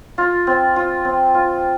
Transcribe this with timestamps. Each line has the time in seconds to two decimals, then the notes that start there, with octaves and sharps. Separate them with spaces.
0.18 F4
0.47 C4
0.76 F4
1.05 C4
1.35 F4